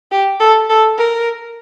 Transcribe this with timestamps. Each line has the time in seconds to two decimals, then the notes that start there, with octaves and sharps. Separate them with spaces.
0.11 G4
0.40 A4
0.69 A4
0.98 A#4